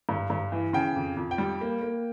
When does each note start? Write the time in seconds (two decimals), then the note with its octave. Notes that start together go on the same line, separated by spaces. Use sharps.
0.09 G2
0.30 G2
0.52 E3
0.73 C#3 G5
0.96 F2
1.17 F2
1.31 G5
1.38 G3
1.61 A#3
1.82 A#3